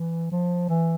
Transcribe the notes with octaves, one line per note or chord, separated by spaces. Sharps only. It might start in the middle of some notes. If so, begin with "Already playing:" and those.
Already playing: E3
F3
E3